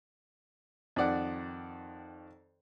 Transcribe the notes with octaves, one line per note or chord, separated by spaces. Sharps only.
F2 D#3 D5 F#5